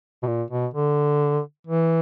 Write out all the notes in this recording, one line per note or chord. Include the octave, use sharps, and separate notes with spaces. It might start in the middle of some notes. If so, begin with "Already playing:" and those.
B2
A#2
B2
D3
E3